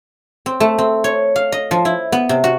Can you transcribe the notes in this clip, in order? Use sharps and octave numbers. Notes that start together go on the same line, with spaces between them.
C4
A3
C4
C#5
F5
D#5
F3
E4
B3
C3
F#4